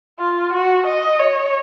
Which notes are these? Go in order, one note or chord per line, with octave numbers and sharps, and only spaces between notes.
F4
F#4
D#5
C#5